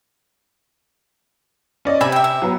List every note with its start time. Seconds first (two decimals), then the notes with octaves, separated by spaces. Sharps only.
1.85 C#4 D5 D#5
2.01 C3 E5 G#5 B5
2.12 E5 G5
2.24 E5
2.42 F#3 B3